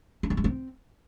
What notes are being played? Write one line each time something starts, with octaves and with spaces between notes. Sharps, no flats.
D4
G3
G#3
C4